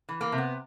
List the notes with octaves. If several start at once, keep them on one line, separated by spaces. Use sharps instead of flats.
E3
A#3
C3
B3